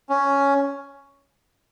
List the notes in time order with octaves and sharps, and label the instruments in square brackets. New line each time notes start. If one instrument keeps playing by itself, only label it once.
[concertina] C#4